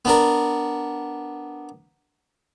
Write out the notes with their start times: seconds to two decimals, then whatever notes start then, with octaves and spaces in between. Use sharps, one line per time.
0.05 B3 D4 A#4